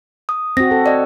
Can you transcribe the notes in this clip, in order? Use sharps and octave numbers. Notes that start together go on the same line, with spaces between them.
D#6
C4 F#4 A#6
A4
D5 D#5